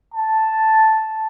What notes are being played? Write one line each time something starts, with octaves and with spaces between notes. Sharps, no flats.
A5